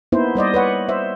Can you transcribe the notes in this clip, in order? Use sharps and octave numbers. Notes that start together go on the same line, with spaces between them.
A#3 B3 D#4 E4 C5
G3 C5 D5 D#5
B4 C#5 F#5
C5 E5